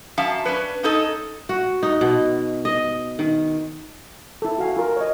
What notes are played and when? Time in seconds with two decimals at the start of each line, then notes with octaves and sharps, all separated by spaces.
0.18 F#2 E5 F5 A5
0.45 C#4 D4 B4
0.83 C#4 D#4 A4 D#5
1.49 F#4
1.83 D#4
2.01 B2
2.65 D#5
3.19 D#3
4.42 E4 A4
4.58 F#4 F5 G#5
4.77 F4 A#4
4.97 C#5 D#5